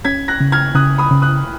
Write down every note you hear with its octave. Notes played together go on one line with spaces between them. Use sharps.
C#4 G#6 B6
F#6 A#6
C#3
F6 G#6
C#3 D#6 F#6
B5 D#6
C#3
D#6 F#6